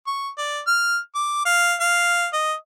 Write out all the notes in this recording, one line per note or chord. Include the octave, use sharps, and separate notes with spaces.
C#6
D5
F6
D6
F5
F5
D#5